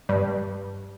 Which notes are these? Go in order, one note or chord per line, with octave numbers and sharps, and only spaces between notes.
G2